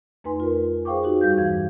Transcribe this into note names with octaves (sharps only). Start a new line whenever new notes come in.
F2 A3 D#4 B4 G#5 C6
F4 A#4
G#4 C5 F5 G5 C#6 D6
D#4 F#4 G4
G2 G3 F5 G6
E2 G2 E3 F5 G#6